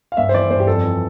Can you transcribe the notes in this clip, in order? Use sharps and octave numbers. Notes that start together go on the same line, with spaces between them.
F5
G2 E5
C5
E3 D5
G2 C5
G4
F2 A4
E3